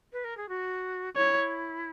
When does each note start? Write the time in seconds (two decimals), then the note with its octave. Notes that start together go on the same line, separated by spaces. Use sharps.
0.13 B4
0.24 A#4
0.37 G#4
0.49 F#4
1.16 E4 C#5